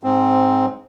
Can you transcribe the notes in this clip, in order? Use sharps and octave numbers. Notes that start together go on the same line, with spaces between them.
G#2 C4